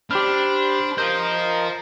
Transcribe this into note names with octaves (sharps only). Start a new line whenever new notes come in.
D4 G4 C5 B5 F6
A#4 C5 D#5 F5 C6 G6